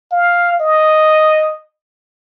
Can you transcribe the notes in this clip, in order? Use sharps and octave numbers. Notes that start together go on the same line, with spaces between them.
F5
D#5